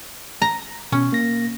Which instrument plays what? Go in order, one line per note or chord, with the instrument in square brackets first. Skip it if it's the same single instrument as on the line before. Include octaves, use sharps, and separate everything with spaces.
[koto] A#5
[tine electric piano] B2 [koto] C#4
[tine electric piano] A#3 A#6